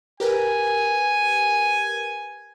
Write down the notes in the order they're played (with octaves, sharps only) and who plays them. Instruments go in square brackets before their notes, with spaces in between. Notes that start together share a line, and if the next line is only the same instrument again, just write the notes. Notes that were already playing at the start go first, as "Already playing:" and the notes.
[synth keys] G4 A#4 B4 [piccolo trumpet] G#5